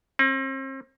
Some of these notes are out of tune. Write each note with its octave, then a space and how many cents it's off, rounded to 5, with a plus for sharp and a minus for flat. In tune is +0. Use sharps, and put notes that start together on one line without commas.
C4 +40